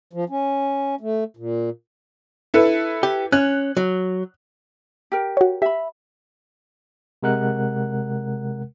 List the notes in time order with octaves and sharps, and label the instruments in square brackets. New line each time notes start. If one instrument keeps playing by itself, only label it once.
[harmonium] F3
C#4
A3
A#2
[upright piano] E4 A4 B4
[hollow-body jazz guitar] G4
[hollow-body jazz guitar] C#4 [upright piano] F#6
[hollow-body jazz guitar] F#3
[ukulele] G4 A#4
[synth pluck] F#4 C#5
[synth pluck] G4 [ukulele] E5 B5
[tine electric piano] C3 G#3 A#4 F#5 F#6